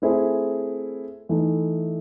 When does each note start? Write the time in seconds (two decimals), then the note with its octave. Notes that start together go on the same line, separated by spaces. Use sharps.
0.02 A3 C4 E4 G#4 C5
1.29 E3 A3 D#4